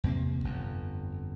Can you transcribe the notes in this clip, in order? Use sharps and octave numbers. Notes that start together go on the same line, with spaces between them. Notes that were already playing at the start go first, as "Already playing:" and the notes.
E2 C3 A#3
G1 F2